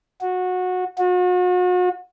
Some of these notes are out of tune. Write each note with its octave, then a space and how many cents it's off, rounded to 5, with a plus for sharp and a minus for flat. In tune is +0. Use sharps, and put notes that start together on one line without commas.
F#4 -20
F#4 -40